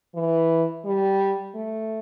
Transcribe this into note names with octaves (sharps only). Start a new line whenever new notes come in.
E3
G3
A3